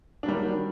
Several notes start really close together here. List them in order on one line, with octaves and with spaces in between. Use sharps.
D4 F#3 G3 D#3